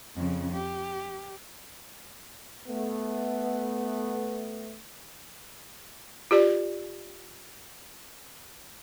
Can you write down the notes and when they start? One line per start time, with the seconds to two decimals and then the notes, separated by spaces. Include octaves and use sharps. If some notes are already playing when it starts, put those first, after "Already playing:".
0.16 F2 C#3
0.54 G4
2.68 A3 B3
6.31 F4 G4 D5